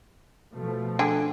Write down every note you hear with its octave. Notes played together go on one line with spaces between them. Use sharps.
B2 F3 A3
D3 G#4 G5